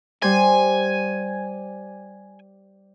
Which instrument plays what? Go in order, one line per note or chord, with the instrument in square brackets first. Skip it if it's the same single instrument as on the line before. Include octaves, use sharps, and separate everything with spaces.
[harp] G3 C5 [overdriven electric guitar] G#5